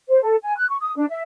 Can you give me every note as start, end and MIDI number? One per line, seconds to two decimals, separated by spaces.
0.08 0.21 72
0.22 0.35 69
0.42 0.57 80
0.57 0.68 90
0.69 0.76 85
0.80 0.92 87
0.96 1.05 62
1.09 1.23 76